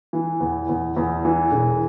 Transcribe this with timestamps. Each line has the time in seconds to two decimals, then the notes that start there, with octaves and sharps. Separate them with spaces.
0.13 E3
0.40 E2
0.69 E2
0.97 E2
1.25 E3
1.52 E1